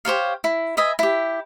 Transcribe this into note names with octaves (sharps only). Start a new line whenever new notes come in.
G4 C5 C#5 F5
E4
B4 D#5 E5 G#5
E4 G4